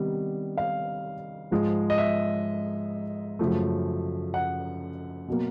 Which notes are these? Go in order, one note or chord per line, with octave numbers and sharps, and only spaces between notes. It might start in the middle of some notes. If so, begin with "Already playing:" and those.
Already playing: C3 D#3 G3 B3
F5
G#2 F3 G#3
D#5
E5
F#2 C#3 F3 A3
F#5
B2 F#3 A#3